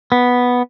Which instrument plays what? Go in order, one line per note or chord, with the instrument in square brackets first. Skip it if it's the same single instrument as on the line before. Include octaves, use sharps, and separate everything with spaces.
[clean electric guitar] B3